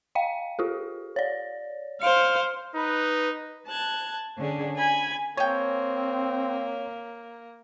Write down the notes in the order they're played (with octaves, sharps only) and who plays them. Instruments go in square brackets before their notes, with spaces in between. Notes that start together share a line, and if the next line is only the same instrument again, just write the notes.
[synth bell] D#5 F5 G5
F4 G4 A4
C#5 D5
[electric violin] C5 F5 [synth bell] C#7 D7
[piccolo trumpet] D#4 [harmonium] B4
[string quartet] A5 F#6 G#6
D3 C#4 D4 G#4
G#5 B5 G#6
[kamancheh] A#3 [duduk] C4 [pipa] G#4 G5 [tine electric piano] C#5